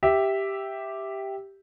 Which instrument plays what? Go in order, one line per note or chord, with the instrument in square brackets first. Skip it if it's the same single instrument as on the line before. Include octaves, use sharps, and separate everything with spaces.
[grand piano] G4 E5